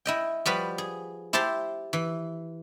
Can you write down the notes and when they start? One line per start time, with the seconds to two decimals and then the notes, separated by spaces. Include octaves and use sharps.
0.06 E4 D#5 G5
0.46 F3 G3 F#4 B4
0.78 G#4
1.33 E4 G4 C5 A5 C6
1.93 E3